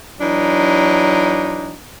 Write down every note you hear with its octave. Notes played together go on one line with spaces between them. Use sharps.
E3 F#3 D4 D#4